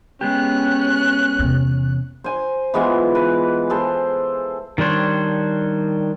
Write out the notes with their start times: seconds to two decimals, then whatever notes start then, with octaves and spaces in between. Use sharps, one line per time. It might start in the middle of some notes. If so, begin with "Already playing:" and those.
0.21 G#3 B3 C#4 G4 F#6
1.39 E2 C3
2.24 C5 G#5
2.74 E3 G#3 B3 F4
3.15 B4
3.70 G#4 A4 C5
4.78 D#3 G3 D4 C5 C#5